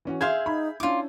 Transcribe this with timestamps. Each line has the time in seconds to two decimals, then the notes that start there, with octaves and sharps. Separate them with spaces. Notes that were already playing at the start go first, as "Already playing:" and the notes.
0.05 E3 C#4 F#4
0.21 G#4 E5 F5 C6 G6 G#6
0.46 D#4 B5
0.80 C#4 D4 E4 F4 D6